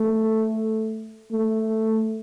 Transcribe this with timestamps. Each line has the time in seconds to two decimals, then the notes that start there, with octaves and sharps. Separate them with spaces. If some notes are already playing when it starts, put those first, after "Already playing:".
Already playing: A3
1.32 A3